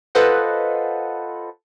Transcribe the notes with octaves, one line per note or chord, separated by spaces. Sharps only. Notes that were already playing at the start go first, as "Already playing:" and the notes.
F4 A4 B4 C5 D#5 F#5